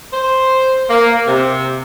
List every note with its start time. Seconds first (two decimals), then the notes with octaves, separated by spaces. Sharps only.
0.13 C5
0.89 A#3
1.28 C3